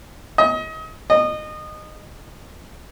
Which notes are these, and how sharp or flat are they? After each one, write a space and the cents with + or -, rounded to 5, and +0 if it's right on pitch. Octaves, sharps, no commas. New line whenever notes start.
D#5 +30
D#5 -25